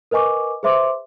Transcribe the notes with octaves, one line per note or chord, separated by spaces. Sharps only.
A#4 B4 D#5 G#5 C#6 D6
G#4 B4 C5 E5 C6 D6